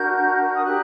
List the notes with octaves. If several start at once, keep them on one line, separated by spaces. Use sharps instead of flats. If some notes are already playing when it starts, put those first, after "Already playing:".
Already playing: D4 F#4 A#4 G6
D#6
D4 G4 A#4 F#6